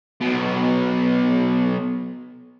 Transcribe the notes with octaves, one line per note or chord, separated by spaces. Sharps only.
B1 B2